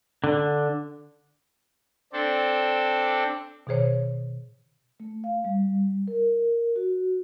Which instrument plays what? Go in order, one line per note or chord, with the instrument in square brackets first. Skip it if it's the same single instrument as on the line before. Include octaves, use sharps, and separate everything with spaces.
[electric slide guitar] D3
[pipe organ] C4 D4 A4
[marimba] B2 D#3 G#4 C5 C#5
[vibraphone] A3
F5
G3
A#4
F#4